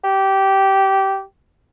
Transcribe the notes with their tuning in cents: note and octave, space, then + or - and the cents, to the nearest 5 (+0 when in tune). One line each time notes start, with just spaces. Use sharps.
G4 -15